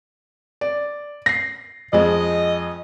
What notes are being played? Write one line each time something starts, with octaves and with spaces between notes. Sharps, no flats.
D5
A#6 C7
F2 G#3 D#5